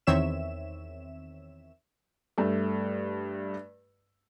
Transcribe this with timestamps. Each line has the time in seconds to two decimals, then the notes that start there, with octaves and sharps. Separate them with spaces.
0.07 E2 D#3 C4 C#5 E5 E7
2.38 G2 A3